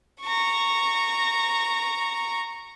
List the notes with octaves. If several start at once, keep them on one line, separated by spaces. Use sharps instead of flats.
A#5 C#6